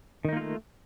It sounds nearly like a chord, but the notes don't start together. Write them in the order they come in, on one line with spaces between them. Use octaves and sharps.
D#3 D#4 A#3 F4 A3